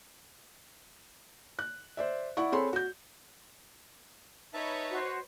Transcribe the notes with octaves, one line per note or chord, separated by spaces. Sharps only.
F#6
C5 D5 E5
E4 D5 F#5 C#6
C4 G#4 A4 C#5 B5 C6
F#4 G6
D#4 B4 C#5 D#5 E5 A5
F#4 C5